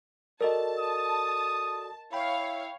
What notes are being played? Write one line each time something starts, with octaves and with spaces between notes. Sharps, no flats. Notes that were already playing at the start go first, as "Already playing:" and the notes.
F#4 A4 A#4 D5 D#5 A5
D#6
E4 C#5 F5 G5 B5